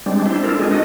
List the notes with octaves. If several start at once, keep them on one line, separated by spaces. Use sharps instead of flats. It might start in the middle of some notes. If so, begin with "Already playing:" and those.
G3 G#3 C4 D4
D4 E4 C5
C4 D4 E4 F4 A4 A#4
G#3 C4 D4 G#4
D4 D#4 F#4 D#5